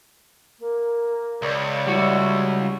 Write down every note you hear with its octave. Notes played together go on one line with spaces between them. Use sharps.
A#3
C#2 D5
G3 E4 F#4